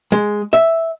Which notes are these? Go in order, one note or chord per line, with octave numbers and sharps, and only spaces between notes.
G#3
E5